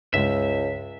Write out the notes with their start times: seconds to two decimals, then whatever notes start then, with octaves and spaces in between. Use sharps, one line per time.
0.14 C#2 G2 C#3 G#3 E5